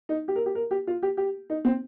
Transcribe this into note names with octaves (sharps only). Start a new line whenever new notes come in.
D#4
G4
A#4
G4
A#4
G4
F4
G4
G4
D#4
C4